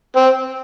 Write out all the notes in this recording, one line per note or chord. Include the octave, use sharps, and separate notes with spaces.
C4